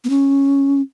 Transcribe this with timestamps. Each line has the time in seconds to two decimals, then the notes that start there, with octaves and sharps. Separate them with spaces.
0.04 B3
0.09 C#4